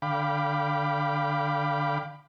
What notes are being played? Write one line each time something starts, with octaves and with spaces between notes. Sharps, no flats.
D3 F5 G5 B5 D6